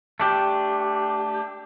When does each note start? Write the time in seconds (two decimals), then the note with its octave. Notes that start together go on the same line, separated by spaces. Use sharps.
0.20 A3 D4 G4